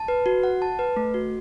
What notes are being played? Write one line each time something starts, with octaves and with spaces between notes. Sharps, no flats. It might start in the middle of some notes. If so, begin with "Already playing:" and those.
Already playing: A5
B4
F#4
F#5
A5
B4
A3
F#4